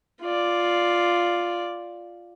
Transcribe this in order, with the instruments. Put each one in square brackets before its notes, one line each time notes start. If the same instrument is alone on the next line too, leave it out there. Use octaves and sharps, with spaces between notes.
[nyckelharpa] F4 D5